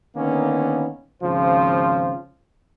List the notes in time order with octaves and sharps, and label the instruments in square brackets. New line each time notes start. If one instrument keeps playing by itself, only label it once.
[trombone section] D3 D#3 A#3 B3 C#4
G#1 C#3 F3 F4 C5